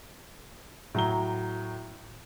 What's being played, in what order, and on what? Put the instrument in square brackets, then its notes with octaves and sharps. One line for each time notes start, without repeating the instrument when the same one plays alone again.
[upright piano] A2 F#3 A#5 G7